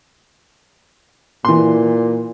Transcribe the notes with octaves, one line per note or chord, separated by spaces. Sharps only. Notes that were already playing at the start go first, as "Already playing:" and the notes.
A#2 E3 C6